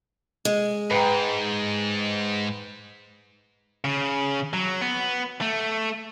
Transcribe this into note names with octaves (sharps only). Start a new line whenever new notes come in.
G#3
G#2 B4 G5 A#5
C#3
F#3
B3
A3